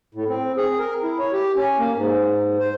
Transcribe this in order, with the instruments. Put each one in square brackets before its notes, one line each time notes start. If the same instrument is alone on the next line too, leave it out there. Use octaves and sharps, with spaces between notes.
[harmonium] A2
C4
G#4
A#4
E4
C#5
G4
C#4
A#3
G#2
C5